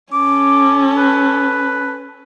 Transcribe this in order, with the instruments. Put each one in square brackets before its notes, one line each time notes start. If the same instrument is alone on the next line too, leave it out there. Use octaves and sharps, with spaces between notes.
[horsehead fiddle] C#4 A4 [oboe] D6
[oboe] B4